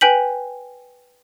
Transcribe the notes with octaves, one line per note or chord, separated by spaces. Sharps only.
B4 G5 G#5 G6 B6 F#7